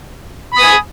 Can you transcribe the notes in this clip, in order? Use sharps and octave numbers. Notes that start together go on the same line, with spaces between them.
G#5 B5 D#6